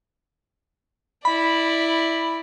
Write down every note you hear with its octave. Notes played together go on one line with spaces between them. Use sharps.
E4 D5 B5